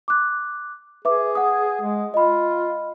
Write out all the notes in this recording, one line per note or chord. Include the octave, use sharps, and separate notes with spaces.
D6 F#6
G#4 B4 E5 D6
F#5 D#6
G#3
F4 D#5 B5